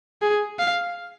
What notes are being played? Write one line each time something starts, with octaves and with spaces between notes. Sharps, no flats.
G#4
F5